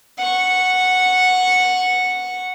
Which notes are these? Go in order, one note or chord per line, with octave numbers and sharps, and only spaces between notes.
F#5 C#6